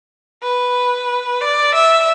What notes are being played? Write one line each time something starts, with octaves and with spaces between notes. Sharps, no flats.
B4
D5
E5